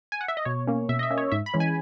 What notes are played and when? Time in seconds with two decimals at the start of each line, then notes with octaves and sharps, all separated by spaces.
0.12 G#5
0.21 F#5
0.28 E5
0.37 D#5
0.45 B2 C#5
0.67 A#3 C#4
0.89 B2 E5
0.99 D#5
1.03 E5
1.11 A#3 C#4
1.18 C#5
1.32 G#2 E5
1.46 B5
1.54 E3 G#3 C#4
1.60 G#5